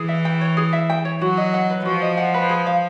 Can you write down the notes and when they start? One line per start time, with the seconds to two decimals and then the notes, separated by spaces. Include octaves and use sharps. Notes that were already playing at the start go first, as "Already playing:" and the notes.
Already playing: E3 G#4
0.08 E5
0.25 G5
0.41 C#5
0.57 G#4
0.73 E5
0.90 G5
1.05 C#5
1.21 F#3 F#4
1.37 D#5
1.54 F#5
1.70 B4
1.85 F3 F#4
2.02 D#5
2.17 F#5
2.34 B4
2.49 G#4
2.67 F5